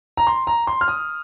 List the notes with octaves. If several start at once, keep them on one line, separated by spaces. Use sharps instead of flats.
A#5
C6
A#5
C6
F6
D#6